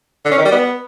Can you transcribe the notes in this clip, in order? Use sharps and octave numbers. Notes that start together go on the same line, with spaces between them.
D3
C#4
D#3
G3
B3